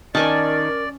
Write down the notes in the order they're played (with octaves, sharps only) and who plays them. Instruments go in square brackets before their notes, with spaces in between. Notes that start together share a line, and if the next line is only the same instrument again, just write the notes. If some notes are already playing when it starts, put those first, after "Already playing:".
[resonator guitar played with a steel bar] D#3 [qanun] C#4 G#5 A5 [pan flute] A#4 [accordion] D5